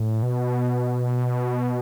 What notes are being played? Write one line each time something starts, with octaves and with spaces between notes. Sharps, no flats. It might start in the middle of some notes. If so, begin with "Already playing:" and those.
Already playing: A2
B2